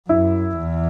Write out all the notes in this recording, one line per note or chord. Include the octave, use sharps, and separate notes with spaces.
F#2 E4
E2